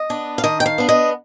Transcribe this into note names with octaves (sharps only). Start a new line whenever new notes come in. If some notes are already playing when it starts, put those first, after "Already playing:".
Already playing: D#5
B3 D4
F5
D#3 D#5
G5
F5
B3 D4
D#5